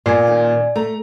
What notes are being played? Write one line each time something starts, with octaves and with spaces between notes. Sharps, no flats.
A#2 B3 D5 G#5 G#6
D#3 A#3 C#4
A3 A#5